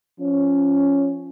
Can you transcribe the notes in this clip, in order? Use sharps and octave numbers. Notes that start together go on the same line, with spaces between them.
F3 C#4